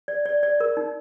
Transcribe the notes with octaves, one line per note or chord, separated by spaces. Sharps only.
D5
D5
D5
A#4
D#4